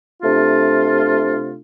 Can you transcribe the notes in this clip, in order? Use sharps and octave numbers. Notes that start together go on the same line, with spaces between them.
C3 A3 D4 F4